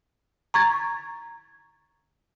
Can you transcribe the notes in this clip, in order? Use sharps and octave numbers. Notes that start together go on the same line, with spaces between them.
A#5 C#6 G#6 A6